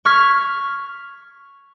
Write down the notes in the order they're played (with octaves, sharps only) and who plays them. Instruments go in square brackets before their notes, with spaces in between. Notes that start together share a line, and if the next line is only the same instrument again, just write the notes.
[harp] C#6 F6 G#6 B6